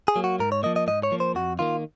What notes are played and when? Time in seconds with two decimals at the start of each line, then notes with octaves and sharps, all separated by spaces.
0.08 G#4
0.16 F#3 A#3
0.24 F#4
0.39 G#2 A#4
0.52 C#5
0.63 F3 A#3 D#5
0.76 D#5
0.87 G#2 D#5
1.03 C#5
1.12 F3 A#3
1.20 C5
1.35 F2 F#4
1.59 D#3 A#3 F4